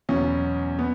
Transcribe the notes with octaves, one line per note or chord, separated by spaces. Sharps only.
E2 B2 F#3 C#4
B3